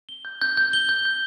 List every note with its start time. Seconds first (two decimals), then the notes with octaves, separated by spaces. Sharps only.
0.09 G7
0.25 G6
0.41 G6
0.57 G6
0.73 G7
0.89 G6
1.05 G6